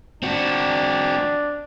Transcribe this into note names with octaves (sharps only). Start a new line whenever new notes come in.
C4 D4 F#4